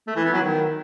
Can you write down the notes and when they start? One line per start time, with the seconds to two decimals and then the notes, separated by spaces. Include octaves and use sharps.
0.07 A3
0.16 E3
0.24 B3
0.33 F#3
0.41 D#3